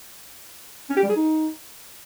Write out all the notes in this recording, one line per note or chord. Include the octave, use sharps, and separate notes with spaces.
C#4
G4
G3
G#4
D#4